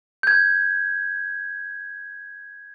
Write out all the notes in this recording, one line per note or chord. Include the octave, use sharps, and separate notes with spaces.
G6 G#6